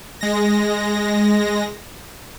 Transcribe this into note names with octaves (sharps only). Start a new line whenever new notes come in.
G#3 A#6